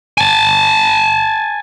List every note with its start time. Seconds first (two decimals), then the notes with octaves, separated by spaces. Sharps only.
0.18 G#5 A5